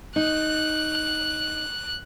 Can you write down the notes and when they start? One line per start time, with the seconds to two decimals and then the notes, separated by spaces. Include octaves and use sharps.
0.16 D#4 F#6